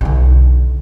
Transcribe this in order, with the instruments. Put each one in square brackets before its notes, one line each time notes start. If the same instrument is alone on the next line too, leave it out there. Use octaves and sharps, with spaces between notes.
[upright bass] B1 D3